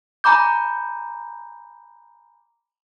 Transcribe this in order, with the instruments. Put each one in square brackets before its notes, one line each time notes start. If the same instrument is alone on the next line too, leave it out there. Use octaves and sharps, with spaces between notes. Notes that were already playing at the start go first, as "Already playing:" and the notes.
[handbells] G#5 A#5 B5 D6 G6